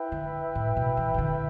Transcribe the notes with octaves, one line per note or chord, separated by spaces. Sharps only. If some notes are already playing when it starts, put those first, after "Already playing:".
Already playing: E4 B4 E5 G5
D3
A2
B2
E3
B2
D3